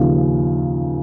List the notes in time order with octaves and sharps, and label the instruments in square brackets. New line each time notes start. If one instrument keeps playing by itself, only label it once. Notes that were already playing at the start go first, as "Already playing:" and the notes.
Already playing: [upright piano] D#2 C#3 F3